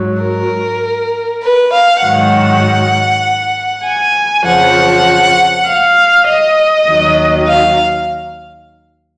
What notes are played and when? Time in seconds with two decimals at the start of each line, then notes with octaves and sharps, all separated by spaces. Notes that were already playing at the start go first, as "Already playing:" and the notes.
Already playing: G#2 F#3
0.22 A#4
1.42 B4
1.72 F5
2.02 G#2 D#3 F#3 F#5
3.84 G#5
4.44 F2 C#3 F3 F#5
5.65 F5
6.26 D#5
6.86 D#2 D#3 F#3
7.47 F5